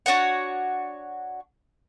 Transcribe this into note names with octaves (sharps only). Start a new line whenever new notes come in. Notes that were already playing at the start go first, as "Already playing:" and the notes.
D4 F#4 C#5 F#5